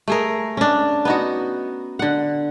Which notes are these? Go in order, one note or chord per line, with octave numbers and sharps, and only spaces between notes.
A3 G#4 A#4
C#4 D4
B3 D#4 F#4
D3 F#5